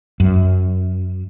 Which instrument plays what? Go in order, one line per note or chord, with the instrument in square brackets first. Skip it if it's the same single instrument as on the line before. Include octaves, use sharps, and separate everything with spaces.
[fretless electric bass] F#2